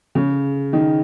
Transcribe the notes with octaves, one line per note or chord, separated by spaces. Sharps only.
C#3
D#3